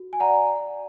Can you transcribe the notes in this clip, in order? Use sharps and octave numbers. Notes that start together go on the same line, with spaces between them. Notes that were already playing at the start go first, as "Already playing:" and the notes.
Already playing: F#4
G#5
D5 F#5 A#5